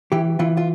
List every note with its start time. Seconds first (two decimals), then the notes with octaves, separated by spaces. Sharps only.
0.12 E3 G4
0.39 E3 F4
0.57 F4